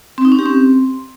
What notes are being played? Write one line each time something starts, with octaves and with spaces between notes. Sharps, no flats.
C4
D#4
C#4
G4
C4